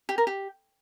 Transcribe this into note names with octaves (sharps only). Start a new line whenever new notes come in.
G4
A#4
G4